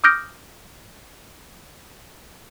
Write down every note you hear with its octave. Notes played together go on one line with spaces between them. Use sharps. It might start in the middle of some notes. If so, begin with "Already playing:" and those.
D6 D#6 F6 G6 A#6 D7